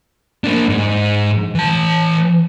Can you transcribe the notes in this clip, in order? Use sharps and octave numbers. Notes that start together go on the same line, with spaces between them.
A#3 D4
G#2
E3 A5